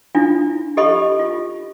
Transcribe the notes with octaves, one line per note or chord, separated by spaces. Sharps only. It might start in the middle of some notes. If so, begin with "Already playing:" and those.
D4 E4 F4
G4 A4 D#5 B5 C#6
F4